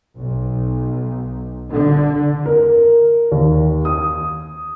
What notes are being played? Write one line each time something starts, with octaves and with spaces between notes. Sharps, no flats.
B1
D3
A#4
D#2
D#6